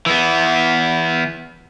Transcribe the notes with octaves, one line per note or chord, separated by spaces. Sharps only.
E3 B3